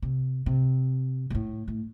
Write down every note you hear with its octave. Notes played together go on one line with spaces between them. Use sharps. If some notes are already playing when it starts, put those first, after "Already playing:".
C3
C3
A#2
A2
A2